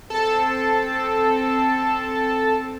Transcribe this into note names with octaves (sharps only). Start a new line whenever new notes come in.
C4 A4 A5